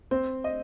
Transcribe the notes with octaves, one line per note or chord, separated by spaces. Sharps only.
C4 C5
D#5